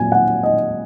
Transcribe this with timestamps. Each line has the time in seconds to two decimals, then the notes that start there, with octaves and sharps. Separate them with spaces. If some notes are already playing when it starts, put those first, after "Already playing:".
Already playing: A#2 F#3 C4 G#5
0.12 F#5
0.43 D#5